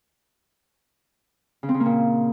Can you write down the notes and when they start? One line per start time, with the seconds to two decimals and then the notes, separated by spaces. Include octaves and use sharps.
1.63 C#3
1.69 C4
1.74 C#3
1.80 A#3
1.86 A#2